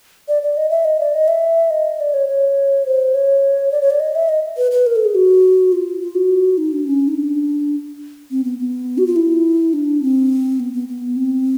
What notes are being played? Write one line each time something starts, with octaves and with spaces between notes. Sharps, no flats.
D5
D5
D#5
E5
D#5
D5
D#5
E5
D#5
D5
C#5
C#5
C5
C#5
D5
C#5
D5
D#5
E5
D#5
B4
B4
A#4
A4
G#4
F#4
F4
F4
F#4
D#4
D4
C#4
D#4
D4
C4
B3
B3
F#4
F4
E4
D4
C4
B3
B3
B3
C4